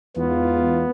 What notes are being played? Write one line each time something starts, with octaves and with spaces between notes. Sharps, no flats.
E2 G#2 B3 F4